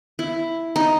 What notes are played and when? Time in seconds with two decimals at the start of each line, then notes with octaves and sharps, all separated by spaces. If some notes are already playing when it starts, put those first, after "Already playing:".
0.19 E4
0.76 D#4